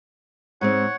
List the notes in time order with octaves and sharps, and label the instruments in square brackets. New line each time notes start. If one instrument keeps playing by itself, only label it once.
[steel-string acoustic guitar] G#2 G#3 C4 [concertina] C#5 F#5